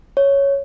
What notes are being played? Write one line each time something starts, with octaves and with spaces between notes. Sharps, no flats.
C#5